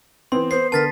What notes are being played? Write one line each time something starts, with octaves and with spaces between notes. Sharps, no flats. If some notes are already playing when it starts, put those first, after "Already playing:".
E3 B3 C4 C6
B3 C5 C7
D3 B3 A#4 A5 A6 B6